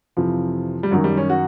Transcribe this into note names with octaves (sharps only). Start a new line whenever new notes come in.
F2 C3 E3 F3
G3
F#2 D#3 F#3
G3
C#4
F#4